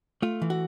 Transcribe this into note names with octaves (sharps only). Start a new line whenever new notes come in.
A3 F4
E3
F#4